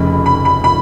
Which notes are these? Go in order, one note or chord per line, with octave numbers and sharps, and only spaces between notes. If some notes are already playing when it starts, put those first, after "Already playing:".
Already playing: F1 F2 C#3 B5
B5
B5
B5